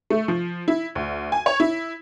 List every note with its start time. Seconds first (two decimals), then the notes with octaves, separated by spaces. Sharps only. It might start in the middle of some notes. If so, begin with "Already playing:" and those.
0.10 A3
0.28 F3
0.68 E4
0.95 D2
1.32 G#5
1.46 C#5
1.60 E4